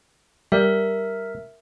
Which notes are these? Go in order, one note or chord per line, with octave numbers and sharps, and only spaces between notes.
G3 A#4 E5